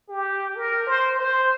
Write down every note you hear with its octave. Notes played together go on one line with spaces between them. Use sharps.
G4
A#4
C5
C5